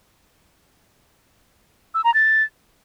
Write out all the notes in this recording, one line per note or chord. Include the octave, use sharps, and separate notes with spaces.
E6
A#5
A6